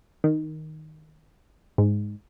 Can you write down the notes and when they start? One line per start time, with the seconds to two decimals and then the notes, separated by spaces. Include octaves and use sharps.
0.24 D#3
1.78 G#2